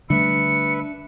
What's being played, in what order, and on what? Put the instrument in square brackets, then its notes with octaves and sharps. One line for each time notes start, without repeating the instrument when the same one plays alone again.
[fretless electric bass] D3 G3 A3 [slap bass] D4 [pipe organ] B4 E5 [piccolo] C#7